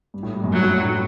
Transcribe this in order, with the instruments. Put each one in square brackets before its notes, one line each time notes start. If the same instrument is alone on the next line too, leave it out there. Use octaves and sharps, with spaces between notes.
[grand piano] G2
A2
G2
F#2
[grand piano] G2 [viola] F#3
[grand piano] A2
G2
A2